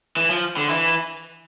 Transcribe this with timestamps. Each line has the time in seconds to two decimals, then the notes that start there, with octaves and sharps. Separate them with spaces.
0.17 E3
0.30 F3
0.57 D3
0.70 E3